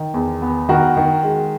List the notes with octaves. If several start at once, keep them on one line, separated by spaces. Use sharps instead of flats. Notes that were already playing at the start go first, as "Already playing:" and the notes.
Already playing: D#3
E2
B3
D#3 F#4 A#4
D#3
G#3